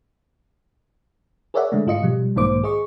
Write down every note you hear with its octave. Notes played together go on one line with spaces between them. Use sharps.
G#4 A#4 C#5 D5 E5 F#5
D3 G#3 A3
G#2 F4 D#5 C#7
B2 F3 G3
B1 G#2 D#3 A#3 C5 D6
G#4 D#5 C#6